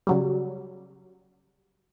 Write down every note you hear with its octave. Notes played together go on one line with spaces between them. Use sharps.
C#3 F#3 G3